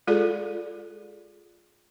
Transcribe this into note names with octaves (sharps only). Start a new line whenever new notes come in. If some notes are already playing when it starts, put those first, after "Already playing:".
G#3 F4 G#4 A4 D5